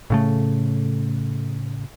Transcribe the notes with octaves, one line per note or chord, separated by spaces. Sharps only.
A2 C#3 A3